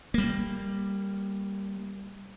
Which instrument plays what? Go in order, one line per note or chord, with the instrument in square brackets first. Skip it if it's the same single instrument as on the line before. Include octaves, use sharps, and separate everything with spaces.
[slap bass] G3 A#3